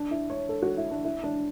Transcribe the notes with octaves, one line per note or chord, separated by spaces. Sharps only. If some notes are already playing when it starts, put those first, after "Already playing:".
Already playing: D4
E4
C#5
A4
F#4
E4
D4
E4
D4